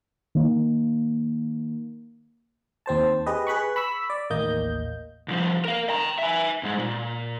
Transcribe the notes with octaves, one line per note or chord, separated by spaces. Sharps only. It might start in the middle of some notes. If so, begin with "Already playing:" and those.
D#3 A#3
D#2 C4 C5 A5
G4 G#4 B4 D#5
G#4 B4 B5 C#6
B5 C#6 E6 B6
D5
A1 D#2 A#3 D#5 G6
C2 F3
A#4 F5
G5 A#5
E5 G#5
G#2 G#3
A#2